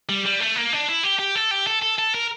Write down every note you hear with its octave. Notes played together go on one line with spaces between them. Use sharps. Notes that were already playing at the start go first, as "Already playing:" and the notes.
G3
G3
A3
A#3
D4
E4
G4
G4
A4
G4
A4
A4
A4
A#4